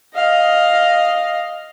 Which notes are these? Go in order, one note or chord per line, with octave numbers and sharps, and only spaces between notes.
D#5 F5